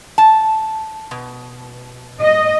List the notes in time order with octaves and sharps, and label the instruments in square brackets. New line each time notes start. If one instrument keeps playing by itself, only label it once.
[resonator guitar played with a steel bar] A5
B2
[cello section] D#5